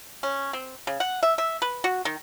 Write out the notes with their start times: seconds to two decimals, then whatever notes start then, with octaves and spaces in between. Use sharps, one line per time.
0.23 C#4
0.53 C4
0.87 C#3
1.00 F#5
1.23 E5
1.38 E5
1.62 B4
1.84 F#4
2.05 D#3